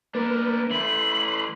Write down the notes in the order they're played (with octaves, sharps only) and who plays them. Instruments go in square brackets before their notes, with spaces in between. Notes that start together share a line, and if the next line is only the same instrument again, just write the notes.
[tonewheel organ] A#3 B4 [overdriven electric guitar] D4 A#4
[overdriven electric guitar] E3 A3 [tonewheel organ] B5 C6 [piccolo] F#7